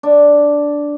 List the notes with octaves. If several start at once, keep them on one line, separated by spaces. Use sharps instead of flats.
D4